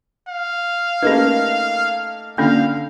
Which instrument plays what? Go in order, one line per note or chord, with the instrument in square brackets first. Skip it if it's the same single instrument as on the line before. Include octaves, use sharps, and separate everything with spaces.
[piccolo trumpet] F5
[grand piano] A3 A#3 D#4 [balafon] C#4 G4 B4
[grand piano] D3 [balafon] A#3 C#4 F4 [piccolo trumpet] F5